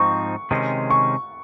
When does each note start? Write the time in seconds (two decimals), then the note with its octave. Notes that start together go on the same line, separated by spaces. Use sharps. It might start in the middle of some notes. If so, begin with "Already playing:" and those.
Already playing: G#2 F3 C4 D#4 C#6
0.51 C3 D#3 G#3 C#4
0.90 C#6